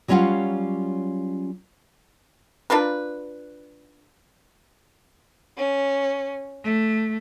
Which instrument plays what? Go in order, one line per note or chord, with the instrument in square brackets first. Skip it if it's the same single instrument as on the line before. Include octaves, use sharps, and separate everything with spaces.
[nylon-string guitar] F#3 G3 C#4 F4 F5 F#5
[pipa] D4 F4 A#4 B4
[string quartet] C#4
A3